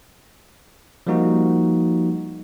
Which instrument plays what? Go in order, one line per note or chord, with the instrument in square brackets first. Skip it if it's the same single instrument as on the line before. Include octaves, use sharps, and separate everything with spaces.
[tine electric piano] F3 G3 A#3 D#4 F#4